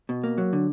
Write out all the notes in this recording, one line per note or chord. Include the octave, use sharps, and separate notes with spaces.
B2
A#3
F#3
D3